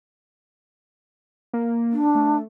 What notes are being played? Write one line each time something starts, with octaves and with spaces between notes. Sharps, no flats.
A#3
D4
A3